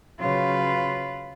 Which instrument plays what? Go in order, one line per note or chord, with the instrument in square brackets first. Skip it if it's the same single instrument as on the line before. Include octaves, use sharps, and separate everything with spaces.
[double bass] C#3 F#3 [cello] F4 B4